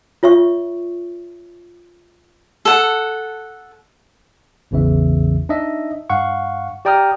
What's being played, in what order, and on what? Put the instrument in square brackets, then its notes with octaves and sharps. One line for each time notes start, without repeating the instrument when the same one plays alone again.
[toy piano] F4 C#5 E5 C#6
[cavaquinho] A4 F#5
[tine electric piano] A1 E2 C#3 E3 E5
D4 D#4 D#5 E5
G2 F5 F#5 C#6
G4 D5 G5 A#5 D#6 F6